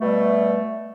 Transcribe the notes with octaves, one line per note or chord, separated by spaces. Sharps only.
B2 G3 A3